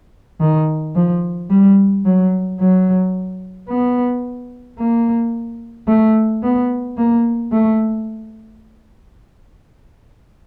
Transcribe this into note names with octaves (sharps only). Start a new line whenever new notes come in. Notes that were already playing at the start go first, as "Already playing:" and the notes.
D#3
F3
G3
F#3
F#3
B3
A#3
A3
B3
A#3
A3